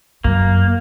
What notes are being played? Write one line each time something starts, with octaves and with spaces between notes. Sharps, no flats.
F#2 A#3